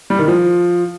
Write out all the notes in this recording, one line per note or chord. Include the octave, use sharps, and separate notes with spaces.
G3
D#3
F3